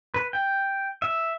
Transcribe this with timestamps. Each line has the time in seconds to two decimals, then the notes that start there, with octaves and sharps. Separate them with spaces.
0.14 B4
0.33 G5
1.02 E5